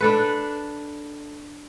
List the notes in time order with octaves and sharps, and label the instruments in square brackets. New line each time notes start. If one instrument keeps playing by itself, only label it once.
[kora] D4 A4 B4